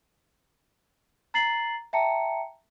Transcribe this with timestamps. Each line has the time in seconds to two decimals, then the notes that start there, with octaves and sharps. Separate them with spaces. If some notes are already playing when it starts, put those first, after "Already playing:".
1.34 A#5 A6 C7 F#7
1.93 E5 G5 A5 A#5 C#7